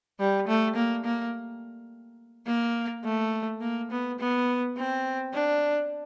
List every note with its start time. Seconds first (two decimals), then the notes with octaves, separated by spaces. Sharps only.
0.20 G3
0.48 A3
0.76 A#3
1.05 A#3
2.47 A#3
3.05 A3
3.61 A#3
3.91 B3
4.19 B3
4.77 C4
5.33 D4